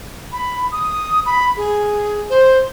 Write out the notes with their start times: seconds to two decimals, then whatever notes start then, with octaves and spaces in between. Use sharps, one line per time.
0.32 B5
0.72 D#6
1.26 B5
1.57 G#4
2.30 C5